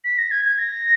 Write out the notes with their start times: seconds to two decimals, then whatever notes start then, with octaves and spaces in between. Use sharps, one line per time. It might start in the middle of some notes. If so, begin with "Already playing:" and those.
0.04 B6
0.18 A#6
0.31 G#6
0.45 G#6
0.58 A#6